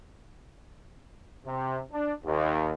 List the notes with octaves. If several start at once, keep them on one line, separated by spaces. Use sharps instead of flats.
C3
D4
D#2